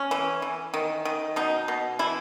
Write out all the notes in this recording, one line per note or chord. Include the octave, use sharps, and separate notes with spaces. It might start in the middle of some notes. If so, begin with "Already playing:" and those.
Already playing: C#4
E3
E3
D#3
D#3
B2 D#4
B2
E3 E4